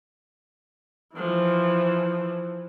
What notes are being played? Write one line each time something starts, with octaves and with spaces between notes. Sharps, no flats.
E3 F3